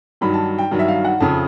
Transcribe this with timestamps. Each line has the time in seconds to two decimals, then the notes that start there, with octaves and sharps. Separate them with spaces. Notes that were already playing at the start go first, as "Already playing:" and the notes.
0.21 G2 D#3 F#3 B5
0.34 A5
0.58 G5
0.71 G2 D#3 F#3
0.79 E5
0.88 F5
1.05 F#5
1.20 F2 C#3 F3 A5